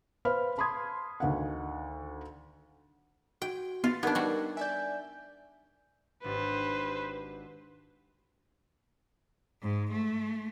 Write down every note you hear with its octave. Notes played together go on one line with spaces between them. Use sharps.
B4 C5 F5 B5 F6
A5 B5 C6 D#6 G#6
D2 D#3 F5 F#5
F#4 G5
B3 F4 A6
B3 D4 D#4 G4 A#4 D5 B5 G#6
G3 F#4
D5 E5 G#5 G6
G#1 D4 G4 B4 C5
G#2
A3